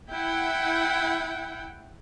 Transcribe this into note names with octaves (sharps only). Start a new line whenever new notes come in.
E4 F#5 G5